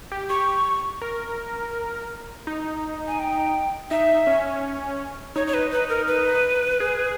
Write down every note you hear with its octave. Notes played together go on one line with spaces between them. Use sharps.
G4
G4 C#6
A#4
D#4
G#5
G5
D#4 E5
C#4
D#4 C#5
C#5
B4
B4
A#4
B4
G#4